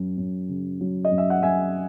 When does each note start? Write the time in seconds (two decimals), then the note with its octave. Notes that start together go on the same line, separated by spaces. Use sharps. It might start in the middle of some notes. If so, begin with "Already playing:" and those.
Already playing: F#2 F#3
0.17 F#2
0.49 C#3
0.81 F#3
1.05 D#5
1.11 F#2
1.18 E5
1.30 F#5
1.42 F#2 E5 G#5